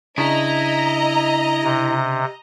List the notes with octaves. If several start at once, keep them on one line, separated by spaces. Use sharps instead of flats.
C#3 D4 E4 D#5 A#5
C3